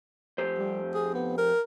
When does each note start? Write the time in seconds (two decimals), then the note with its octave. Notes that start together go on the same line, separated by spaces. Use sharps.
0.38 F2 G4 C5
0.59 G3
0.94 G#4
1.14 B3
1.38 A#4